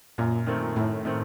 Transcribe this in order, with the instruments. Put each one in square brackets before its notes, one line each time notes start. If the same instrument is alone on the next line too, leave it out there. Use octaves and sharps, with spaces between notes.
[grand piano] F#2 [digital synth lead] A#2
[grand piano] D#3 A3 C4
[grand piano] F#2 [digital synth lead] A2
[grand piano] D#3 A3 C4